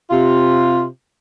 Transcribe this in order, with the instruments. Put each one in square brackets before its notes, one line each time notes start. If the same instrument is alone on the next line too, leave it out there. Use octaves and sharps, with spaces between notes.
[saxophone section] C3 F4